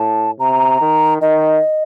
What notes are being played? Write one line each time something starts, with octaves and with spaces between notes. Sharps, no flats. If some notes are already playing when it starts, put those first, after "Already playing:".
Already playing: A2 A5
C3 A#5
D#3
D#3 D#5